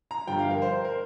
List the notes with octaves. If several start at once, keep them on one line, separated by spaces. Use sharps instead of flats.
A#5
G1 G2 F3 G5
F5
A#4
C5
C5
A#4